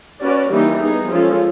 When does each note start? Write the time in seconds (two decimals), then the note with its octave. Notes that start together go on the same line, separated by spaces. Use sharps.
0.22 C#4 F#4 B4 D5
0.50 E3 G3 A#3 D#4 G4
0.81 B3 D#4 G#4
1.10 F3 G#3 C#4 F4 A4